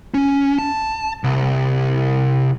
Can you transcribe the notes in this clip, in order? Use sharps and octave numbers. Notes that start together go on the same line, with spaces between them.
C#4
A5
C2